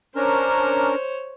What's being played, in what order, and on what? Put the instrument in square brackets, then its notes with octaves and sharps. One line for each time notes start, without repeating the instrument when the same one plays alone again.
[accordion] C#4 D4 A#4 [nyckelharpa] C5 C#5